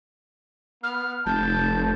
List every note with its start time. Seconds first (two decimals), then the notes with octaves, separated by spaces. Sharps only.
0.83 B3 F6
1.26 F1 A5 G6